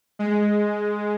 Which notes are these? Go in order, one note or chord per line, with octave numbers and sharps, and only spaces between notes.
G#3